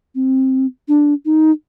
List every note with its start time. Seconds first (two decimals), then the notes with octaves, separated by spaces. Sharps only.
0.15 C4
0.88 D4
1.25 D#4